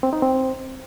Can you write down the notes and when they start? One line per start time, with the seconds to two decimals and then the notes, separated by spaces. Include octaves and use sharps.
0.03 C4
0.13 D#4
0.22 C4